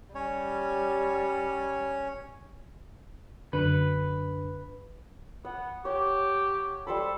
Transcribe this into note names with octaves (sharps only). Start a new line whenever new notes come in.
G3 C#4 C#5
F#2 D3 B4
B3 F#5
G4 C#5
G3 A4 C5 B5